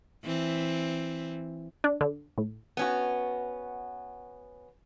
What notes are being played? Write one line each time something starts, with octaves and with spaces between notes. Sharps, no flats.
E3 C4
D4
D3
A2
B3 C#4 F#4